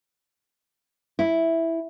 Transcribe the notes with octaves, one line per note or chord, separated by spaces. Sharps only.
E4